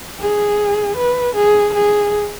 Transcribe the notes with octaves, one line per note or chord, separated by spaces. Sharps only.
G#4
B4
G#4
G#4